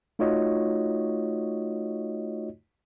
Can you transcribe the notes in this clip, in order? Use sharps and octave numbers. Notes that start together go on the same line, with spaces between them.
A3 D#4 F4 F#4 C#5 D#5